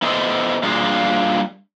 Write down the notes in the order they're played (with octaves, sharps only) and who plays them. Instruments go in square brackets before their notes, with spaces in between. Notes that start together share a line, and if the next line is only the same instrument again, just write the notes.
[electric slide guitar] B3 E4 A4 C5 D#5
G3 A#3 D4 F4 G#4